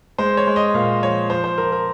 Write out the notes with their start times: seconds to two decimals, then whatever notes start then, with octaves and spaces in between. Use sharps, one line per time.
0.18 G#3 C5
0.37 C#5
0.47 G#3
0.56 D#5
0.74 A#2 F5
1.03 F3 C#5
1.30 F3 C5
1.44 C5
1.58 F3 A#4
1.72 A#4